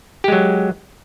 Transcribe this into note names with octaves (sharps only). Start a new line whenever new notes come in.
F#3 G#3 G4